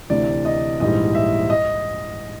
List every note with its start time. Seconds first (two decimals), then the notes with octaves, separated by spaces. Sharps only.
0.10 D2 C3 E3 D5
0.45 D#5
0.80 A#1 G#2 E3 G3 D#5
1.15 E5
1.50 D#5